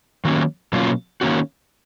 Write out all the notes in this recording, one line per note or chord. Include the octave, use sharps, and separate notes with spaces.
D#3 F#3 A#3 C#4
B2 F#3 A#3 C#4 F4
D#3 A#3 C#4 F#4